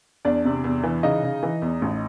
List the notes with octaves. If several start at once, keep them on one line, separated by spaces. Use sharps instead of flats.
E2 D4 D5
C3
E2
E3
C#3 D#4 D#5
C#3
E3
E2
A1